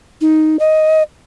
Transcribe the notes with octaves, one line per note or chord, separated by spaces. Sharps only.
D#4
D#5